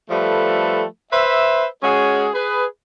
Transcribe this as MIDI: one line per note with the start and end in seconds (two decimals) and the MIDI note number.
0.11 0.84 53
0.11 0.84 55
0.11 0.84 57
0.11 0.84 69
0.11 0.84 71
1.13 1.67 71
1.13 1.67 72
1.13 1.67 76
1.83 2.29 56
1.83 2.29 61
1.83 2.29 66
1.83 2.29 68
2.34 2.65 68
2.34 2.65 71